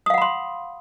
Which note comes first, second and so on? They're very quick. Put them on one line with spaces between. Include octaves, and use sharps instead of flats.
D#6 F5 F#5 B5 C6